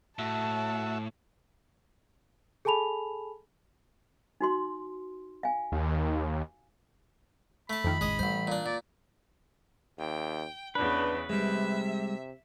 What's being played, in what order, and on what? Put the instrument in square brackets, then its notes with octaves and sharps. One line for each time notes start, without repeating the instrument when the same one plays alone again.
[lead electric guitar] A2 [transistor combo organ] F#4 E5 [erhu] A5
[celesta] G#4 A4 G#5 A5 B5 F7
[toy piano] D#4 F#4 C6
F5 G#5
[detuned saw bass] D#2
[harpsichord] A3 A5 [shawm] B5
[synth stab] F2 D#3
[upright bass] A1 [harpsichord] G#3 D#5
[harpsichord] A1 C5 [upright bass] E3 G3
[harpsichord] A#2 D4
[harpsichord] A#2 [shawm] D5
[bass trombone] D#2 [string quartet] G5
[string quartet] E2 C#3 B3 [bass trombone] D4 [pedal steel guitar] B4
[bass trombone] C3 [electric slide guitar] G3 G#3 [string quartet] E5